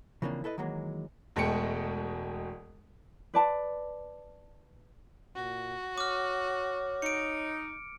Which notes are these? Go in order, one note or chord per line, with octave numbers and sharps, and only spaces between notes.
C#3 E3 F3 A#3 C4 D4
E4 A4 B4 D#5
D#3 E3 F#3 G#3 A#3
E1 B2 G#3 A3 G5 C#7
B4 D5 A5
A#2 F#4
C#5 D6 F6
D#4 C#7 D7